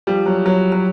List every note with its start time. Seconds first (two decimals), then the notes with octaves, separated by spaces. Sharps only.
0.07 F3 G3
0.26 F#3
0.46 F#3
0.72 F#3